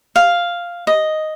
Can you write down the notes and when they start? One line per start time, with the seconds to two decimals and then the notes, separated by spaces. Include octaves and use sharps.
0.16 F5
0.87 D#5